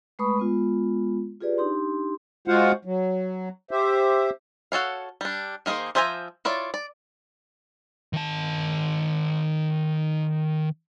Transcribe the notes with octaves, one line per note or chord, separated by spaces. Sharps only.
G#3 A3 B4 B5 C#6 D#6
G#3 B3 F4
F4 G4 G#4 B4 D5
D4 D#4 G4 C6
G#3 F4 F#4 C5 F5 F#5
F#3
G4 C5 E5
F#4 A4 C#5 F5
G3 D4
D#3 A#3 E4 G#4 C5
F3 C5 E5 G#5 A#5
E4 F4 C#5 D5
D5
D#3 A5